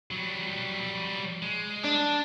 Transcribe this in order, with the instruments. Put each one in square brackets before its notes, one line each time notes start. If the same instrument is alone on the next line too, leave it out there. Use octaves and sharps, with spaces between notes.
[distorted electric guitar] F#3 G3
G#3
[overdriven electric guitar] D4